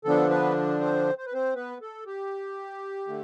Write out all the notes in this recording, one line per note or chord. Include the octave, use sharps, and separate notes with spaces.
D3 F3 B3 D4 A4
B3 B4
C4 C5
C5
B4
C4 C5
B3 B4
A4
G4
D3 A3